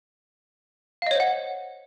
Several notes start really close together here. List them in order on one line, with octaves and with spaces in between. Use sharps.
F5 D#5 C#5 C5 F#5